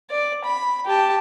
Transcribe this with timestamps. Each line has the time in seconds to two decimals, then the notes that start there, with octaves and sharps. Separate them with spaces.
0.10 D5
0.44 B5
0.86 G4 A5